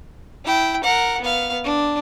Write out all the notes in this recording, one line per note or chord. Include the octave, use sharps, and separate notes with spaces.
E4 G5
A#4 F#5
B3 F5
D4